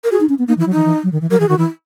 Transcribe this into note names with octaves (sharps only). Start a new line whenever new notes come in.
A#4
F#4 G#4
D#4
C#4
B3
A#3 D#4
E3 E4
F#3
E3 D#4
E3
F#3
D#3
E3
F#3 A#4
E3 G#4
D#3 F#4
E3 E4